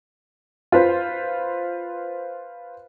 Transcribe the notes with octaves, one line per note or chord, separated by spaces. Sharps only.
F4 B4 C5